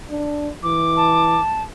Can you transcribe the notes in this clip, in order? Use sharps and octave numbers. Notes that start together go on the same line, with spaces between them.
D4
E3 D6
A5